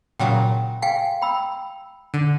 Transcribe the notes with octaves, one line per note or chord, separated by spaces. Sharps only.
A#2 C#3 F#3 G5
F5 G5 G#5 C7
G5 B5 E6
D3